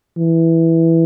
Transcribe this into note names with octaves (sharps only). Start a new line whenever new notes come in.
E3